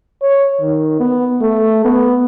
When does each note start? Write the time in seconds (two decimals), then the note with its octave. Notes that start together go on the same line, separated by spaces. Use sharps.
0.22 C#5
0.60 D#3
0.99 B3
1.41 A3
1.84 B3